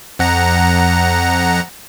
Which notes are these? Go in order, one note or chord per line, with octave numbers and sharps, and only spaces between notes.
F2 F#5 A#5